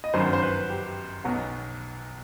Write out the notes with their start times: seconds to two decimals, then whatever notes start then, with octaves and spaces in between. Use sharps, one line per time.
0.04 D#5
0.14 G1 F#2 D#3 F#3 C5
0.33 C5
0.42 B4
0.70 G4
1.24 B1 B2 F#3 B3